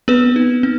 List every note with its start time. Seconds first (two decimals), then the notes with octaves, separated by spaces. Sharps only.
0.08 B3 C4 B4
0.36 D#4
0.63 C4